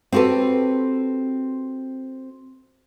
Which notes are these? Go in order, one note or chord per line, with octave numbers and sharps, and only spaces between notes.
C4 F#4 G4 A4 B4